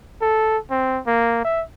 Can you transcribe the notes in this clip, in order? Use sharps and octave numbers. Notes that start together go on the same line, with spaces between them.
A4
C4
A#3
E5